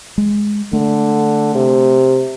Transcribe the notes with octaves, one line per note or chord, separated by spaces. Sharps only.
G#3
D3 A3
C3